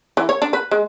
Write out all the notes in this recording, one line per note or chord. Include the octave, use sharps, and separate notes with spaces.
E3
C#5
D4
B4
G#3